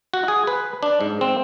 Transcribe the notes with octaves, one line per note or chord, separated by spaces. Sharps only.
F#4
G#4
B4
D4
G#2
C4